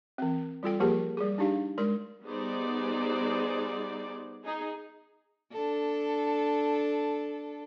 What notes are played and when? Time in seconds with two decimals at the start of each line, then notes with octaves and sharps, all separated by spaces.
0.18 E3 C4
0.63 G3 F4 A4 G5
0.80 F3 A#3 G4 G#4 A#4 A5
1.17 G3 G#4
1.38 D4 D#4 G4 F5
1.78 G#3 A#4 C6
2.25 G3 B3 D#4 G#4 C5 D5
4.44 D#4 G#4
5.52 D4 A4